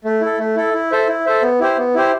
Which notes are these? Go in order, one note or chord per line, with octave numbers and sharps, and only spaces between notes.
A3
E4 A4
A3
E4 A4
E4
A4 C5 E5
E4
A4 C5 E5
B3
E4 G4 C5
B3
E4 G4 C5